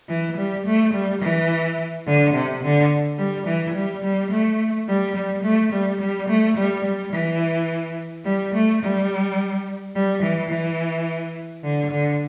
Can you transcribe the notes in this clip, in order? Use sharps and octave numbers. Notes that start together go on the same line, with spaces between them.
E3
G3
A3
G3
E3
D3
C3
D3
G3
E3
G3
G3
A3
G3
G3
A3
G3
G3
A3
G3
G3
E3
G3
A3
G3
G3
E3
E3
D3
D3